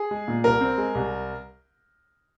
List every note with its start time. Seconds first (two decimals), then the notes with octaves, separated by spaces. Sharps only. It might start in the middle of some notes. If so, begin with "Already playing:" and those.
Already playing: G#4
0.11 G#3
0.28 A#2
0.44 C2 A#4
0.61 C4
0.78 G#3
0.95 C2